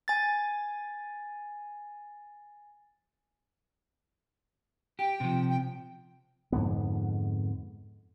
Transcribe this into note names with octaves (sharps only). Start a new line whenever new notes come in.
G#5 A6
G4 G5
C3 F3
G5
F2 G#2 D3 B3